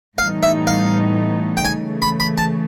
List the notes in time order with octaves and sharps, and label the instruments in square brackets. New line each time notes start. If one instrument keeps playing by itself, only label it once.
[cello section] A2 E3 G3 B3 D#4 [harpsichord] F5
[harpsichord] E5
F5
G5
[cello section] C#3 E3 A3 [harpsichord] G#5
[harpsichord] B5
B5
A5